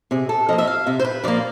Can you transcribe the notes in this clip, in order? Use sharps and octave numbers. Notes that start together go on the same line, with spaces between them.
C3 G#4
A4
F3 A#3 D#5
E5
F5
C3 E5
C5
B4
F3 A#3 D5